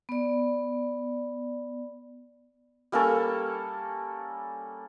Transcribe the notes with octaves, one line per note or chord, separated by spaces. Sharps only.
B3 D5
G3 A#3 C#4 A4